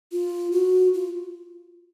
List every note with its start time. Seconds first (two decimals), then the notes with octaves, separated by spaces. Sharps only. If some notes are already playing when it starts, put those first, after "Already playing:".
0.12 F4
0.52 F#4
0.94 F4